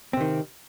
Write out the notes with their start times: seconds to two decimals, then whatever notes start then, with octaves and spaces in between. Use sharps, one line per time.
0.13 C4
0.17 C3
0.21 D#3